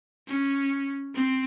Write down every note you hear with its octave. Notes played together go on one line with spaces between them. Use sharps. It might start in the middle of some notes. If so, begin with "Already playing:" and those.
C#4
C4